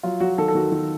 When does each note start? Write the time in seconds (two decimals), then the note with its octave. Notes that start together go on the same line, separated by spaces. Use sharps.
0.03 F#3 F4
0.20 F#3 F#4
0.38 D#3 A4
0.48 A4
0.55 D#3 F#4
0.72 D#3